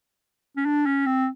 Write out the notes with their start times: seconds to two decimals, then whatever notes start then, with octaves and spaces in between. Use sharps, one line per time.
0.56 C#4
0.66 D4
0.86 C#4
1.06 C4